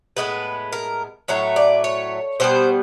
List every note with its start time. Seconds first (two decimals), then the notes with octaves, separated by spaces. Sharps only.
0.16 A2 F3 G#3 B3 B4
0.72 A#4
1.28 A2 F#3 A3 C#5
1.56 D5
1.84 C#5
2.40 B2 G3 B3 C5